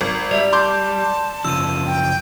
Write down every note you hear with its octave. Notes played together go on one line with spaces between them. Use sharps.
G#1
G3 D5 E5
A5 C6 D6 G6
F#2 C#3 F3 E6 D#7
G5